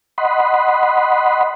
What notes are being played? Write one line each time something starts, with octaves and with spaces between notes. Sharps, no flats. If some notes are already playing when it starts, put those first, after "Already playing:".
D#5 F#5 B5 C6